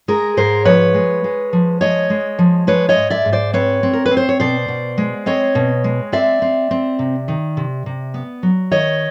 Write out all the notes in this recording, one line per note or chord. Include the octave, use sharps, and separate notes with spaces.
G#3 G#4 A#4
G#2 A#4 C5
F3 B4 C#5
G#3
G#3
F3
G#3 C#5 D#5
G#3
F3
G#3 B4 C#5
C#5 D#5
G#2
D5 E5
G#2
C5 D5
C4 B4 C#5
C4
A#4
B4
C4
C5
C#5
B2 C5 D5
B2
G#3
C4 C#5 D#5
B2
G#3
C4 D5 E5
C4
C4
C3
D#3
C3
C3
B3
F#3
D#3 C#5 D#5